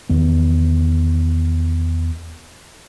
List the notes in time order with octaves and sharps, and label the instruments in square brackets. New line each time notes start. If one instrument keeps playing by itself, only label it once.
[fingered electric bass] E2 D#3 B3